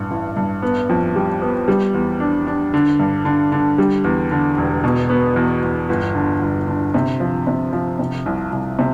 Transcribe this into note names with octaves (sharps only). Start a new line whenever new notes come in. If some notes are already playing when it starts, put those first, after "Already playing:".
Already playing: A1 G2
A1
G2
B3
F2
G3
B3
G3
E2
D4
D4
D3
G2
D3
D3
G3
E2
D3
E1
B2
B3
E2
E2
G1
D3
G1
D3
C3
F3
C3
F3
C3
C2
C2
C3